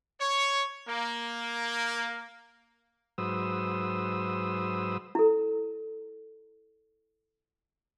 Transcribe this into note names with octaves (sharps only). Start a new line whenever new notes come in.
C#5
A#3
G#2 F#3 B4 C5 D#6 E6
E4 A4